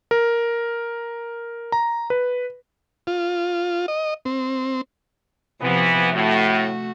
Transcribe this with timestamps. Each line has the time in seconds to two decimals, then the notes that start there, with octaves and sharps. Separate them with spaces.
0.11 A#4
1.72 A#5
2.10 B4
3.07 F4
3.88 D#5
4.25 C4
5.61 C3 E3 F3 B3
6.13 A2 A3 F#4